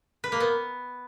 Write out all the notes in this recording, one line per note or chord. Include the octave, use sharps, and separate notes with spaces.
B4
A#3
B3